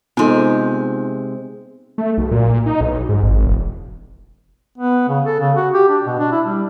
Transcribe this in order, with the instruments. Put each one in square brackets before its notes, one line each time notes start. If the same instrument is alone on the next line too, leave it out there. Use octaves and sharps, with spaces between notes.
[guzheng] C3 G#3 [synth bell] B3 D#4
[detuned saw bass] A3
B1
A#2
D#4
B1
G#2
G#1
E1
[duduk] B3
C#3
A4
C#3
F#4
G4
D4
B2
D4
E4
G3